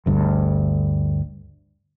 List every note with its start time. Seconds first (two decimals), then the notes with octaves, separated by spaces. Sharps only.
0.06 G1 D2 G2